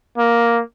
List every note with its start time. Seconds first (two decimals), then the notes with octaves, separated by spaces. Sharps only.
0.18 A#3